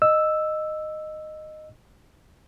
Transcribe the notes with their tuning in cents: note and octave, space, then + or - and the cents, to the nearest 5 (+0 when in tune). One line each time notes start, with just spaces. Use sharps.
D#5 -10 E6 +0